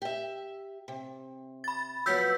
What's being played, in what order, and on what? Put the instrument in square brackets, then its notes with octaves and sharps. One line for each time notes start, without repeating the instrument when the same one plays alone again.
[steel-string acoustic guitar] G4 E5
C3
[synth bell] B5 A6
[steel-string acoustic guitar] F3 F#3 B3 [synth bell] E6 G6 B6